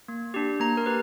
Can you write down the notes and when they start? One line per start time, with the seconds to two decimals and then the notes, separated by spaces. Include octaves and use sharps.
0.08 A#3
0.34 D4 G4
0.60 A#3 A#5
0.77 A#4
0.86 G4 B4